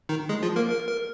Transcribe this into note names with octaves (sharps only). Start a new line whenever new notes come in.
D#3 D#4
G#3 G#4
F3 F4
A#3 A#4
A#4
A#4